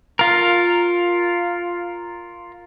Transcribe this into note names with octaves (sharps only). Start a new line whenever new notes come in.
F4 A#4